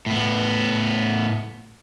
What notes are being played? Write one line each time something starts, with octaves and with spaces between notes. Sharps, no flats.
A2 B3